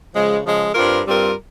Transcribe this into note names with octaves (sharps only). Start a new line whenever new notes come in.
C#3 F3 G#3
C#3 F3 G#3
G2 G3 C4 F4 A#4
G2 G3 C4 F4 A#4